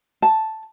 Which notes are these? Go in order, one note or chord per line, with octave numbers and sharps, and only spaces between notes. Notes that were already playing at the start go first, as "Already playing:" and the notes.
A5